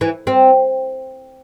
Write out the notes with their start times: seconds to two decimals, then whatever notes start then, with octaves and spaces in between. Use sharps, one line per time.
0.01 E3
0.27 C4